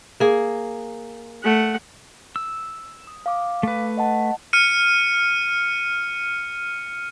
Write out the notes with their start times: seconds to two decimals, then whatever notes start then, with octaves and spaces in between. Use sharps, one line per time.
0.20 A#3 G#4
1.43 A3 F#5
2.36 E6
3.07 D#6
3.26 F5 D6
3.63 A3 B4
3.97 D#5 F#5 A5
4.53 F6 C#7 D#7